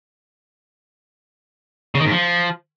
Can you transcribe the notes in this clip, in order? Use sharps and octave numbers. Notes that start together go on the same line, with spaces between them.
C#3
D#3
G#2
F3